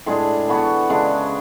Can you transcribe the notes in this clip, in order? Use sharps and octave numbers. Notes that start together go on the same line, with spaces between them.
A2 G#3 D4 G#4
E3 B3 F#4 A4
C#3 G#3 D4